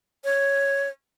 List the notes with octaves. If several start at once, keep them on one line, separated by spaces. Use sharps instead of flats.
C#5